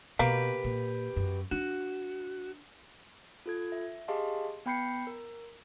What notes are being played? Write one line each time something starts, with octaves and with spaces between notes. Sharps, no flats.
B2 A#3 G4 B4
A#2
F#2
D4 F#4
F4 A4 G#6
E5
G4 G#4 D#5 F5 A5 C6
B3 G5 B5 G6 C7 C#7
A#4